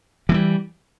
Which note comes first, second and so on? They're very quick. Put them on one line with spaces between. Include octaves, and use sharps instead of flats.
E3 A3 G3